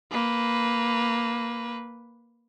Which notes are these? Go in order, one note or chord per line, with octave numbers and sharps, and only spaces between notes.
A#3 B4